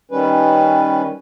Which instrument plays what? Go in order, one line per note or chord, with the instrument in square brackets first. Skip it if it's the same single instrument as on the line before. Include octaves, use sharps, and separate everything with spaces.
[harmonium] D#3 G3 C#4 B4